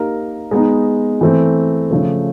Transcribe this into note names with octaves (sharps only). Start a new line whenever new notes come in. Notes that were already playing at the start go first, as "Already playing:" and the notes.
Already playing: A#3 D#4 G4 A#4
G#3 B3 D#4
E3 A3 C4
C#3 F3 A3